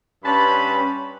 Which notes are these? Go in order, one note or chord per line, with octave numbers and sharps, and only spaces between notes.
G2 C#4 B4 A5 B5 C6